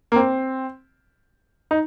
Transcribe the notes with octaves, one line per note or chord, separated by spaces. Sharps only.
A#3
C4
D#4